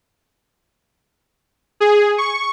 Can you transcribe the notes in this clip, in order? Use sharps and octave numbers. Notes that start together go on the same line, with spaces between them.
G#4
C#6